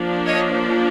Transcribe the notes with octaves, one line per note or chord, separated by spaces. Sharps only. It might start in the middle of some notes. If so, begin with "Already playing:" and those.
Already playing: F3 A#3 D4
C#5 D#5